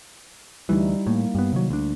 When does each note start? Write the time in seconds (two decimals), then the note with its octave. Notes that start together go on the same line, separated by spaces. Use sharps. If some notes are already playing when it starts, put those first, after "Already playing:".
0.69 D2 E3 G3 D#4 E4
1.07 A2 A#3
1.35 G2 B3
1.53 C3 D#3 F#3
1.70 D2 D4